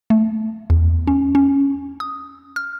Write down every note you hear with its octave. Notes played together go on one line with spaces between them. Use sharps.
A3
E2
C#4
C#4
D#6
F6